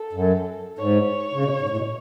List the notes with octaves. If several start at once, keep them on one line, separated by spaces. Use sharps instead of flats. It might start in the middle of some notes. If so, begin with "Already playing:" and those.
Already playing: A4
F#2
G#2 C#5
C#3
B2
G#2
A2
B2